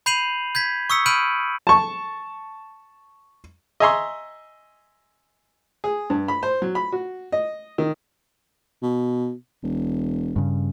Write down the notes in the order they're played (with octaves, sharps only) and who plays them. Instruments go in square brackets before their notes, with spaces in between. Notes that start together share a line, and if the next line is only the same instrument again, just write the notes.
[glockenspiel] B5 G6 C7 D#7 F7 F#7
G6 G#6 B6
C#6 D#6 E6 B6 C#7
B5 F6 G6 D7 D#7 F#7
[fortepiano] A5 C#6
D#5 E5 G#5 A#5 C6 C#6
G#4
G2
B5
C5
F#3
B5
F#4
D#5
D#3
[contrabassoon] B2
E1
[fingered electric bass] G2 C#3